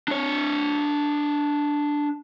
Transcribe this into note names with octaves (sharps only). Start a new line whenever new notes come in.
D4 C#5